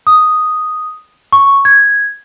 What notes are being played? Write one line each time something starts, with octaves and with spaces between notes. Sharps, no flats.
D#6
C#6
G#6